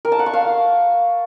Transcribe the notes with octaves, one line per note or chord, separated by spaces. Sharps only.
A#4
A5
F#5
C#6
F5